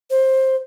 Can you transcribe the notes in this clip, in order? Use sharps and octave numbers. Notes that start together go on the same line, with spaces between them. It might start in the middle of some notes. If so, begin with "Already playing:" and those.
C5